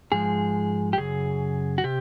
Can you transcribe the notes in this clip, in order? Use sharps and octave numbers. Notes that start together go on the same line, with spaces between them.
G#2 F3 G#3 G#4
G4
F#2 C#3 G#4
F#4
C3 G4